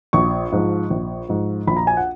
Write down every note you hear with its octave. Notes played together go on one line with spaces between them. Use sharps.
A#1 C#6
G#2 F3
A#1
G#2 F3
A#1 B5
A#5
G#5
F#5